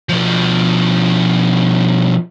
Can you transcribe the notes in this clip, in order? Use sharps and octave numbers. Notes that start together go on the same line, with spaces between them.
B2 F3